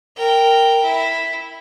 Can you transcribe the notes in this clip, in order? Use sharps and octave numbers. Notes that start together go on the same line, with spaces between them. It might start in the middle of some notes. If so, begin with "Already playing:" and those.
A#4 G5
E4